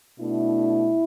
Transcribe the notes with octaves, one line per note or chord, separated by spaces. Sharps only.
B2 A3 D4 E4